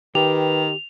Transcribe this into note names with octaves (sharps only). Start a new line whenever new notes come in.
D#3 G4 B4 F7